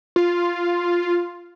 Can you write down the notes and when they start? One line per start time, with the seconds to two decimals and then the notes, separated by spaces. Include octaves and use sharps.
0.16 F4